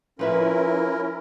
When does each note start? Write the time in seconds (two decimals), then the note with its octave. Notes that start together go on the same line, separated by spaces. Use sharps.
0.19 F3 C#4 E4 A#4 B4 E5